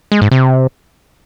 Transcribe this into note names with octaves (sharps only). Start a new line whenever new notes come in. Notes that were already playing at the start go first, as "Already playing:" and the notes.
G#3
G#2
C3